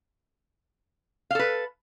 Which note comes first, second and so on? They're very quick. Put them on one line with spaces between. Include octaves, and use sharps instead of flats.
F5 A4 B4